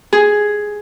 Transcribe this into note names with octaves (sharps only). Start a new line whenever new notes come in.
G#4